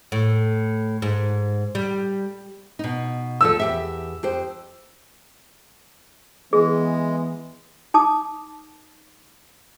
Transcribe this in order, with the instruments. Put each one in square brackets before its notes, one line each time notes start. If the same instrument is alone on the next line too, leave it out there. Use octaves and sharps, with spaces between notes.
[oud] A2
G#2
G3
[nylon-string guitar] B2 D#4
[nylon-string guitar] D2 F3 A4 [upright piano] E6
[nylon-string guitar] E2 G4 E5
F2 G4 C5
[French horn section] E3 B3 [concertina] G#3 [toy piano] G#4
[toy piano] D#4 A5 D6 D#6